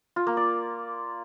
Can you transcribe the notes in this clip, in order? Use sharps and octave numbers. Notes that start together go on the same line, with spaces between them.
F4
A#3
D5